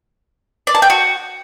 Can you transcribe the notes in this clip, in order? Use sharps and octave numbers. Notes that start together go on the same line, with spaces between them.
D5
A5
G5
F#4